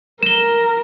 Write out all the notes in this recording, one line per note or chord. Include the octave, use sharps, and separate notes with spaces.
A#4 E7 G7